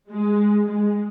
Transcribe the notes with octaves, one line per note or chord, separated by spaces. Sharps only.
G#3
G#3